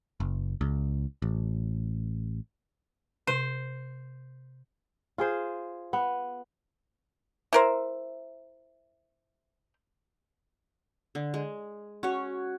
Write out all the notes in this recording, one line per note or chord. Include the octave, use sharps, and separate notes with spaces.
F#1
C#2
A1
C3 C5
F4 G#4 C5
B3
E4 A#4 C5
D3
G#3
C#4 F#4 C#5